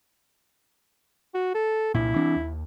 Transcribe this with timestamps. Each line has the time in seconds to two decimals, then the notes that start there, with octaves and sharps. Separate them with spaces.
1.35 F#4
1.55 A4
1.95 C2 A#2 E4
2.16 E3 C4 D4
2.36 D#2